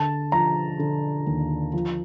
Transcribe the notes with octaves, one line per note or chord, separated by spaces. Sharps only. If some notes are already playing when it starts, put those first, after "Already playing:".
Already playing: D3 A5
F3 A#5
D3
D#2
F3